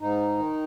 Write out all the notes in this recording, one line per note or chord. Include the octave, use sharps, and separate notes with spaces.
G#2 D#4
D#3